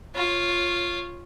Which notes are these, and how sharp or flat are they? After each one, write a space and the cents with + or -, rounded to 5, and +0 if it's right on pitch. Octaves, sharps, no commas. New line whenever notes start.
F4 +0 C#5 -10